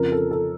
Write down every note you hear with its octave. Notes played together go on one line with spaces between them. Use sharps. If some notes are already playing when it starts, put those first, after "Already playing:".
Already playing: F2 C#3 F3 A#4
A4
A4